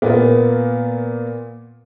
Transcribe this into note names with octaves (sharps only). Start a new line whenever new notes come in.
A#2 A#3 B3